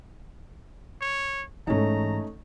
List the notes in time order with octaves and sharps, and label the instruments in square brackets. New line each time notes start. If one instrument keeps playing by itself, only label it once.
[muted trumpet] C#5
[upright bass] G#2 E3 [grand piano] A3 C#4 D#4 [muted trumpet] A#5